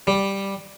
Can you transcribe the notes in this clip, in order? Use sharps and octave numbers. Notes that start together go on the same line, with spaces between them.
G3